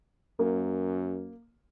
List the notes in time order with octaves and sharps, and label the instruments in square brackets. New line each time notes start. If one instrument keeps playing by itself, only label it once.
[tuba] F#2 [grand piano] A#3